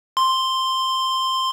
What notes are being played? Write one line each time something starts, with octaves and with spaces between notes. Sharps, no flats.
C6